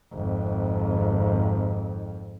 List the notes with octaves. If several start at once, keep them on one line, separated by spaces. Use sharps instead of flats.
G#1 F2